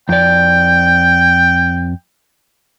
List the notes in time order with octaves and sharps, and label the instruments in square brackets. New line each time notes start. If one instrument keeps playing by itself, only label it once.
[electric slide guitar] F2 D5 [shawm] G5